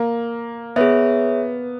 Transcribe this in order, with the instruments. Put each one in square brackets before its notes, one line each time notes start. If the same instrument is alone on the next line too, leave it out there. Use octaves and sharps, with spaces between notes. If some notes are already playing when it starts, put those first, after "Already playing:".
Already playing: [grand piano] A#3
[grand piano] B3 [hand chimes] G#4 C#5 E5